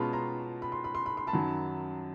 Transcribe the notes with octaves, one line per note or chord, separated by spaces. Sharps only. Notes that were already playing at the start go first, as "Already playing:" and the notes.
Already playing: B2 G#3 C#4 F4 A5 B5
A#5 C6
B5
C6
B5
C6
B5
C6
A5 B5
F#2 D#3 F#3